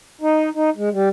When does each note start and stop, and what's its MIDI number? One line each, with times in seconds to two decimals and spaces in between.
0.21 0.49 63
0.55 0.70 63
0.76 0.89 56
0.92 1.09 55